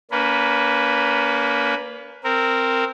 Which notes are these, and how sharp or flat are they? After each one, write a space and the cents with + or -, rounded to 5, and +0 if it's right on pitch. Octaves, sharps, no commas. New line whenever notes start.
A#3 +0 C#4 +40 B4 +0
C4 +0 A#4 -15